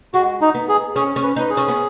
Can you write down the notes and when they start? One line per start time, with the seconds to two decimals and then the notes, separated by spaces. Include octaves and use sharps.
0.14 G#3 F#4
0.41 D#4
0.54 B3
0.69 G#4
0.96 C#4 G#4
1.16 C#4
1.23 B4
1.36 D#4 B4
1.50 G#4
1.57 C#4
1.68 B3